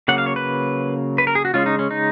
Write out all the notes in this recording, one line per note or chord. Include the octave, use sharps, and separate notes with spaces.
C#3 F#3 A#3 F#5
F5
C#5
B4
B4
A#4
G#4
F#4
C#3 G#3 C#4 F4
D#4
C#4
D#4